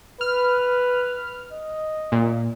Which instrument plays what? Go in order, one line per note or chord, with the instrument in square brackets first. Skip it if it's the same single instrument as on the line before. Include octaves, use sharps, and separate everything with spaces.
[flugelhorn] B4 [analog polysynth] F6
[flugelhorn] D#5
[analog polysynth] A#2